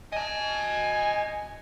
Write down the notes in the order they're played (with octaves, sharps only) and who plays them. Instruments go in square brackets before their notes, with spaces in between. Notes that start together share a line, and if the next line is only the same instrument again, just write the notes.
[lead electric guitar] D#5 A5 [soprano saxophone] G#5